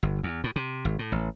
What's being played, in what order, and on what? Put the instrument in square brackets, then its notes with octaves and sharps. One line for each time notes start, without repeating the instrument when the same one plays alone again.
[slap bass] G1
E2
A2
C3
G#1
A2
A1